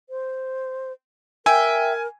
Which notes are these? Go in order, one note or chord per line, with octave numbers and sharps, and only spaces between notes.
C5
A#4 E5 G5 G#5